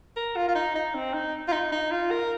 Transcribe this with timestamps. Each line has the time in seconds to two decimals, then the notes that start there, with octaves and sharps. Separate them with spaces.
0.16 A#4
0.36 F4
0.48 F4
0.55 D#4
0.75 D#4
0.95 C4
1.14 D#4
1.48 F4
1.52 D#4
1.72 D#4
1.91 F4
2.11 A#4